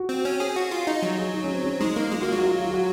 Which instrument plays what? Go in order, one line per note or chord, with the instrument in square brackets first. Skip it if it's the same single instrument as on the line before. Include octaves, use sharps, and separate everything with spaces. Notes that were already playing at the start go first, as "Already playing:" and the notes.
Already playing: [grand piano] F#4
[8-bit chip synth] C4
C#4
G#4
F#4
F4
D#4
F#3
[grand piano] G#4
D#4
C#4
C4
C#4
[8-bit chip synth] G#3 [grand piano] D#4
[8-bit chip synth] A#3 [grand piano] D#4
[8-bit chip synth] G#3 [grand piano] F4
[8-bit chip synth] A#3 [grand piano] F#4
[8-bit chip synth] F#3 [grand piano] F4
[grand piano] F#4
F4
F#4
F4
G#4
F#4